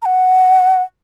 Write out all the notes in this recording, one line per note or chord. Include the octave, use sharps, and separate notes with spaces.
A#5
F#5